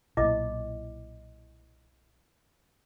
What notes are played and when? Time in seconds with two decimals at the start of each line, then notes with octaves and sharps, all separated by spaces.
0.17 B1 A#2 E4 D#5 D6